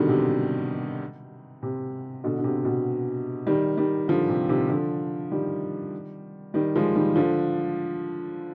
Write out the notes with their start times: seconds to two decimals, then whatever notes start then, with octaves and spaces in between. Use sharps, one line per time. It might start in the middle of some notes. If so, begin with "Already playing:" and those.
Already playing: B2 D3 D#3 G3
0.09 C3
1.63 C3
2.24 B2 D3
2.38 D3
2.44 C3
2.65 B2
3.47 D#3 G3
3.77 D#3 G3
4.08 D3 F3
4.29 C3
4.49 C3 D#3
4.69 D3 F3
5.32 D#3 G3
6.54 D#3 G3
6.75 F3 G#3
6.96 D#3 G3
7.16 D3 F3